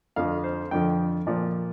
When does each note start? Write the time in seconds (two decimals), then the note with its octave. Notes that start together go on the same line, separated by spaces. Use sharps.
0.16 F2 D3 F3 F5
0.44 C5
0.71 F2 D3 F3 G5
0.89 G5
1.27 A#2 F3 D5